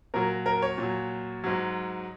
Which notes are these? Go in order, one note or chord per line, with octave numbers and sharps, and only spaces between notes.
A#2 F#3 A#4
A#4
C#5
A#2
F#3
G#2 F#3